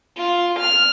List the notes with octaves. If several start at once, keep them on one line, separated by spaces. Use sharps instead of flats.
F4
F6